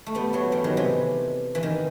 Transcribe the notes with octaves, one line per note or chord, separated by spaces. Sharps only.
A3
G3 B3
F#3 A3
E3 G3
D#3 F#3
C3 E3
E3
D#3